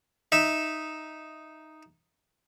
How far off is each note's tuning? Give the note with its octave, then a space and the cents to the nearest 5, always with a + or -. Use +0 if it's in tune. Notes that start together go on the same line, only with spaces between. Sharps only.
D#4 +0 E5 +0